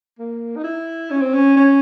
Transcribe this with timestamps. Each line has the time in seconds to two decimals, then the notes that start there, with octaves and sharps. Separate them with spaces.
0.19 A#3
0.56 D#4
0.64 E4
1.11 C#4
1.22 C4
1.34 C#4
1.56 C#4